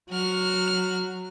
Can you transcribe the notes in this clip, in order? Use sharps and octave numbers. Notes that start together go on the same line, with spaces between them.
F#3 F#4 F6